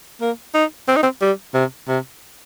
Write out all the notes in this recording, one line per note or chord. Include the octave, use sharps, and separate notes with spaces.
A#3
D#4
C4
D#4
C4
G3
C3
C3